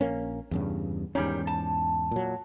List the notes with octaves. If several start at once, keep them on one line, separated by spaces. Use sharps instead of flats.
A#1 A#3 C#4
E2 G2 C#3
E2 G#2 D#3 G3 C#4
A5
A#2 F#3